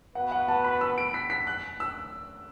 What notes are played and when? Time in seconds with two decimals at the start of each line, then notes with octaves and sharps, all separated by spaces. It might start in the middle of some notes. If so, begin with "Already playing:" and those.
0.15 B3 F#4 B4 F#5
0.32 F#5
0.48 A5
0.64 B5
0.81 E6
0.98 D7
1.14 B6
1.30 B6
1.47 F#6
1.80 E6